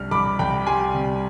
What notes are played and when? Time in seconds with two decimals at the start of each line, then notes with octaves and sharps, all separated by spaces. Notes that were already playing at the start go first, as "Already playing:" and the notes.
Already playing: C2 G3 D4 F6
0.11 C2 B5 D6
0.39 C2 G5 B5
0.67 G3 G#5 C6
0.94 C3